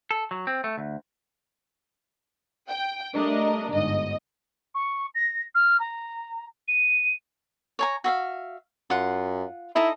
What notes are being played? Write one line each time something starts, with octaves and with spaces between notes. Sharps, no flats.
A4
F#3
C4
A3
D2
G5
G3 A3 D4 A#4 D#5
G1 G#2 D#5
C#6
A#6
F6
A#5
D#7
C#5 G#5 A#5
F#4 E5 F5
F#2 F4 F#5
D#4 E4 A4 D#5